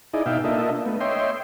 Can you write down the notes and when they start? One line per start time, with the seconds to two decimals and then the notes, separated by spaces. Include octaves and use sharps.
0.14 D#4 E4 G#4 D5 D#5
0.26 B2 D#4 E5 F5 G5
0.44 A#3 D4 F4 A4 D#5 E5
0.85 A3 B3
1.00 C#5 D#5 E5 G5 C6